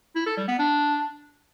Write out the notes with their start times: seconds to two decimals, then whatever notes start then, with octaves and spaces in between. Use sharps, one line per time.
0.15 E4
0.26 A4
0.37 G3
0.48 B3
0.59 D4